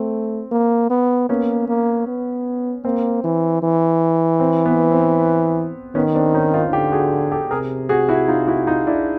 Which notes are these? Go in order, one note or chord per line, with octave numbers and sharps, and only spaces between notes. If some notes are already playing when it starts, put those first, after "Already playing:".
Already playing: A3 C4
A#3
B3
A#3 B3 C#4
A#3
B3
A#3 C4
E3
E3
C4
B3
C4
D#3 B3 C#4
C4 D4
C#4 D#4
D#4 F4
D3 F4 G4
F#4 G#4
G4 A4
C3 G#4 A#4
F#4 G#4
E4 F#4
D#4 F4
E4 F#4
D#4 F4
D4 E4